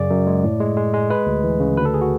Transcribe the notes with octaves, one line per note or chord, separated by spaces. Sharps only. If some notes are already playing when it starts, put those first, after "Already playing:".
Already playing: F#2 C#3 D5
F#2
G#3
A2
G#3
G#3
G#3
G#3 B4
D2
E3
C#3
D2 B4
A4
G#4
F#4